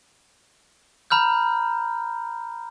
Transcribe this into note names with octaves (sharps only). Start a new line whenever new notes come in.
A#5 B5 F6 G6